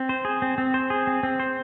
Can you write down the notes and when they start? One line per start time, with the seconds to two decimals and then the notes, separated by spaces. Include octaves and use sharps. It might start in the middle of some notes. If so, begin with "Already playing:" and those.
Already playing: C4
0.09 C5
0.25 G#4
0.42 C4
0.58 C4
0.74 C5
0.90 G#4
1.07 C4
1.23 C4
1.40 C5